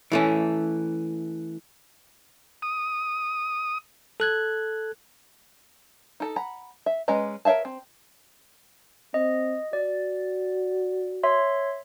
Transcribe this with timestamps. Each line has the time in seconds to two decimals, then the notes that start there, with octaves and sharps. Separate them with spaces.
0.12 E3 A3 C#4
2.62 D#6
4.20 A4 F#6 G#6
6.20 D#4 A4
6.36 F#5 A#5 B5
6.86 E5
7.08 G#3 C#4 B4 D#5 A#5
7.45 A#4 C#5 E5 F5 A5
7.65 C4
9.14 C4 D#5
9.73 F#4 D5
11.23 C#5 E5 C6